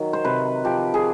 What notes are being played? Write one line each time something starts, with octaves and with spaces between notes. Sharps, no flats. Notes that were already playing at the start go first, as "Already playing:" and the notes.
Already playing: D#3 F#3
C5
C3 B4
F3 G4
G#4